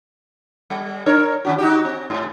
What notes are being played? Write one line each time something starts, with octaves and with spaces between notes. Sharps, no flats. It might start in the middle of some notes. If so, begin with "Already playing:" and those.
G3
D4 A#4 C#5
D#3 C#4 F#4
D#4 F#4 G4
C4
G#2